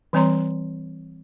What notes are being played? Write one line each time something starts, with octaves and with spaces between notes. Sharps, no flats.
E3 G3 C4 C#5 A#5 C6